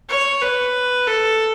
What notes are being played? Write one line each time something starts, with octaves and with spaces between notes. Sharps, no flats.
C#5
B4
A4